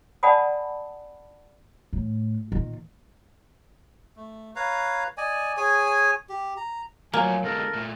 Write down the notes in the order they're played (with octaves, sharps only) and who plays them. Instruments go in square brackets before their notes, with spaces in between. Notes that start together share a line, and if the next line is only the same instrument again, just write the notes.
[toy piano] D5 F#5 G#5 A5 B5 D#6
[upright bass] A2
A#2 D#3
[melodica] A3
B4 C#5 F5 A#5
D5 D#5 G#5
G#4 C#5 G#5
G4
A#5
[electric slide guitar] F3 A3 F#4 [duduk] F#3 [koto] A#3 [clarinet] G#5
[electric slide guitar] B2 D3 G#3 [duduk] A4 [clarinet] A#4
[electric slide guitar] A#2 A3